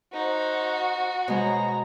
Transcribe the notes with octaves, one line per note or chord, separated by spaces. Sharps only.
D#4 F#4 C5
B2 G#3 C5 A#5